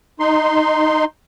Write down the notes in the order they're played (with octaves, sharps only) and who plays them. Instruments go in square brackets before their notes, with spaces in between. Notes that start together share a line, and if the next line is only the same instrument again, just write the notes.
[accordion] D#4 C6